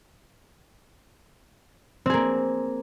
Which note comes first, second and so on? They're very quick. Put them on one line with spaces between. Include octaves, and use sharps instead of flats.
C4 G#4 A#3